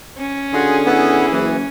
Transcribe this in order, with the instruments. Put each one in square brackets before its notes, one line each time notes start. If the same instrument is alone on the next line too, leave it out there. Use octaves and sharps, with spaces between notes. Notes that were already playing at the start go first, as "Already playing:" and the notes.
[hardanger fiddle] C#4
[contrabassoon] D3 [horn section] F4 F#4 G#4
[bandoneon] B3 [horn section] E4 G#4
[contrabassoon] F#1 [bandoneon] E3